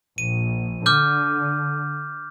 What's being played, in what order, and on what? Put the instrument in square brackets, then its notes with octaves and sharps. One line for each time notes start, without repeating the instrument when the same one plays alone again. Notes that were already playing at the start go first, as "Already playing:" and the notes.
[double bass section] A#1 [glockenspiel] D#7
[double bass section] D3 [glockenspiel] D6 F6 G6